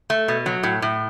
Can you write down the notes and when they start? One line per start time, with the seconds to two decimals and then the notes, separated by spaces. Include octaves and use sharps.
0.10 A3
0.28 B2
0.46 F#3
0.63 A2
0.82 A2